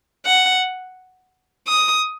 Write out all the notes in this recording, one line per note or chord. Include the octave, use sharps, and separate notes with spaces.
F#5
D#6